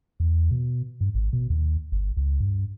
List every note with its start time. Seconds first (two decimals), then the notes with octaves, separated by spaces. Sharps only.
0.20 E2
0.51 B2
1.01 G2
1.15 G#1
1.33 B2
1.50 D#2
1.92 G1
2.17 C#2
2.40 G2